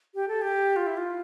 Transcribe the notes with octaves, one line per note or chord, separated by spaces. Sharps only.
G4
A4
G4
F4
E4
F4